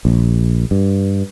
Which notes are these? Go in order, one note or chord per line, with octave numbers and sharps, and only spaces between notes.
A#1
G2